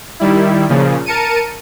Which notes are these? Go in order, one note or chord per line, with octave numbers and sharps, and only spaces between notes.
D#3 G3 E4
A#2 C#3 F3
A#4 A5 C#7 D#7